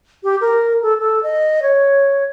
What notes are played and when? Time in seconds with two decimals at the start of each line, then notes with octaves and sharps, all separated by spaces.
0.24 G4
0.41 A#4
0.83 A4
1.00 A4
1.23 D#5
1.62 C#5